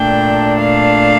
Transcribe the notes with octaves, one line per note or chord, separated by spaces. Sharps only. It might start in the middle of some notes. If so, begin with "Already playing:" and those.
Already playing: A#2 A3 D4 G5
F5